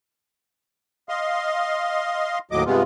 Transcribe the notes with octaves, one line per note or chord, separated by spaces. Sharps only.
D#5 F5 C6
D#2 A2 F#3 D#5 D6
G2 C3 G#3 B3 F4